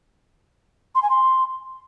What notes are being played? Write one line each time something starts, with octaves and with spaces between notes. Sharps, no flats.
C6
G#5
C6